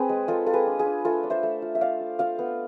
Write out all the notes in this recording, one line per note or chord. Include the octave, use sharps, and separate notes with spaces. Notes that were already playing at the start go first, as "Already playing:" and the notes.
Already playing: C4 G#4 B4
G#3
G#3 F4 A4
F4 A4
G#4 B4
D4
G#4
D4
A3 F4 A4
D4
C5 E5
A3
F4
E5
F4 D5 F5
F4
F4 D5 F5
B3